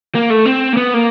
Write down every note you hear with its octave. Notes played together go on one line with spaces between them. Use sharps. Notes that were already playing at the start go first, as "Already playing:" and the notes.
A#3
A3
C4
A#3
B3
A#3